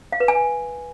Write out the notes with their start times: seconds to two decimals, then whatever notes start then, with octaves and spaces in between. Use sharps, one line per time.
0.12 F5
0.20 B4
0.28 G#5